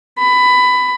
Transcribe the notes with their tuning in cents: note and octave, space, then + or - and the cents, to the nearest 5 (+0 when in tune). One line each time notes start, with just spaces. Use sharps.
B5 +15